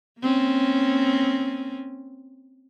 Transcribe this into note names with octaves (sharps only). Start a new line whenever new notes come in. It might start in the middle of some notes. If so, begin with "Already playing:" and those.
A#3 C4 C#4